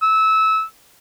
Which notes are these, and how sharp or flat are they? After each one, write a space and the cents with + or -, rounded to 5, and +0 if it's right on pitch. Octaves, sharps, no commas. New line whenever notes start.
E6 -20